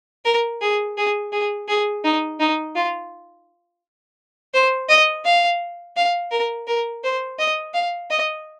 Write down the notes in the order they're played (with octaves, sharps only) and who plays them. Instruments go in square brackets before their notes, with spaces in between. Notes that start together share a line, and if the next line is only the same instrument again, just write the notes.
[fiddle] A#4
G#4
G#4
G#4
G#4
D#4
D#4
F4
C5
D#5
F5
F5
A#4
A#4
C5
D#5
F5
D#5